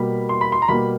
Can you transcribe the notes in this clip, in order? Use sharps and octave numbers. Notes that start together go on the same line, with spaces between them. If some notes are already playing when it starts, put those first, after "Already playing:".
Already playing: B2 G3 A#3 B5
C6
B5
C6
A#5
B2 G3 A#3 B5